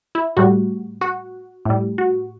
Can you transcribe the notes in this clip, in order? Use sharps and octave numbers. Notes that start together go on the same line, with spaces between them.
E4
A2 G3 F#4
F#4
A2 G3
F#4